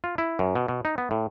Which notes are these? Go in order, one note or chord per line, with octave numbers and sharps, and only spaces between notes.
F4
E4
F#2
B2
B2
D#4
B3
A2